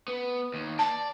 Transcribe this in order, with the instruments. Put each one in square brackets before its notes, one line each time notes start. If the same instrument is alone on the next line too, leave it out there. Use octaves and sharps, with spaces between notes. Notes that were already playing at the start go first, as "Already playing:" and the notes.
[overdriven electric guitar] B3
D#2
[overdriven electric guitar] D5 [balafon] A5